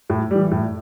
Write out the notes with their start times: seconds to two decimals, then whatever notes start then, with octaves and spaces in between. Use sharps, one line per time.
0.10 A2
0.31 E3 G3
0.51 A2